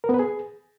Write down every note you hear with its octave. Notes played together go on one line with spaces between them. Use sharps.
A#4
B3
B4
G#4